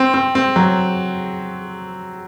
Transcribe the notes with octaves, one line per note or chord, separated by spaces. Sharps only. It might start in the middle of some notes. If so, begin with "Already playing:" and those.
Already playing: C4
C4
C4
F#3